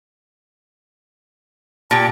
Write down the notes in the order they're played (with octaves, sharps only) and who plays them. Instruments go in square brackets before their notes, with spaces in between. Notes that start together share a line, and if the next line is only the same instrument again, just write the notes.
[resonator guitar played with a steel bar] A#2 G4 [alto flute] A5